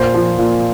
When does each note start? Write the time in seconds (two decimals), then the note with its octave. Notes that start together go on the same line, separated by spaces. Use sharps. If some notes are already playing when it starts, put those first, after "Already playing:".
Already playing: A#2 C5
0.14 F3
0.38 A#2